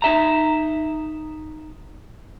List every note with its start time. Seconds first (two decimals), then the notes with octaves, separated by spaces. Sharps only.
0.02 D#4 E5 A#5